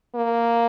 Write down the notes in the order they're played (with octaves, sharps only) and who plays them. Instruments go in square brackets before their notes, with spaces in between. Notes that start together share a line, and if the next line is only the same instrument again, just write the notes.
[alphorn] A#3